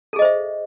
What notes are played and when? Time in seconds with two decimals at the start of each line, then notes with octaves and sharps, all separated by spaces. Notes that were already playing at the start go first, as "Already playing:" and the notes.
0.13 A4
0.16 G#4
0.19 D#5
0.22 C5
0.25 E5